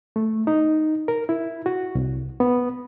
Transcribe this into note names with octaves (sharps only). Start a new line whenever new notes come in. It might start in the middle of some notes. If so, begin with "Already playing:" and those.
A3
D#4
A#4
E4
F#4
C2
B3